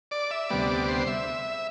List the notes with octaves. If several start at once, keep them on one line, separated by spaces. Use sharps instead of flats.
D5
E5
D2 C3 G3 B3 D5
C5
E5